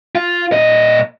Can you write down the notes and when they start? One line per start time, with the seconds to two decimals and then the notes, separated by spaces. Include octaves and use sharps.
0.15 F4
0.52 A#2 D#5